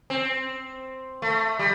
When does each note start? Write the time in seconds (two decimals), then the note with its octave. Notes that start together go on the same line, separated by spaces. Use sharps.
0.10 C4
1.22 A3
1.59 G3